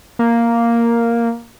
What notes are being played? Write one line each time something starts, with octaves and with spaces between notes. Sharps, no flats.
A#3